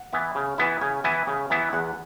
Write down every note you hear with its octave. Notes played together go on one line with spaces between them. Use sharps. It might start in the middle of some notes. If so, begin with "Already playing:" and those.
Already playing: F#5
E3 B3 E4
C#3
E3 B3 E4
C#3 G#5
E3 B3 E4 G#5
C#3
E3 B3 E4
E2 F#5